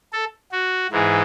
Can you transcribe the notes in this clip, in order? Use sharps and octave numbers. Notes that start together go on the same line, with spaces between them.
A4
F#4
G#2 E3 G#3